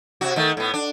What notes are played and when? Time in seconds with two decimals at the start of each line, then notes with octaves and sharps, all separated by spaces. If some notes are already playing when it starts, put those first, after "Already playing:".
0.21 C3 F#4
0.36 D#3 A3
0.57 A2 B3
0.74 D4